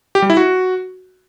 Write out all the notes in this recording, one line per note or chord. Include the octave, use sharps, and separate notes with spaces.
G4
G3
E4
F#4